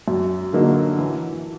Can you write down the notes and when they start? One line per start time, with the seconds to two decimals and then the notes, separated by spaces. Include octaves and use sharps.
0.08 F#2
0.53 D3 F#3 A#3 D#4
0.99 E3